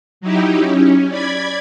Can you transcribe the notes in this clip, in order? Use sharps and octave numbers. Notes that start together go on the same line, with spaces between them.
F#3 D#4 E4 G4
C#4
D5 B5 G#6